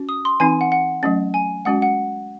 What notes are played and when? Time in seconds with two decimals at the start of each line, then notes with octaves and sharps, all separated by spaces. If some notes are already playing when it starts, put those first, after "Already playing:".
Already playing: C#4 F#4
0.09 D#6
0.25 C6
0.40 E3 C4 D#4 G#5
0.61 F#5
0.72 F#5
1.03 F#3 A3 C#4
1.34 G#5
1.65 G#3 C#4 F#4 F#5
1.82 F#5